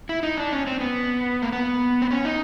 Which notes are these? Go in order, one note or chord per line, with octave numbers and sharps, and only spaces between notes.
E4
D#4
D4
C#4
C4
B3
A#3
B3
C4
C#4
D#4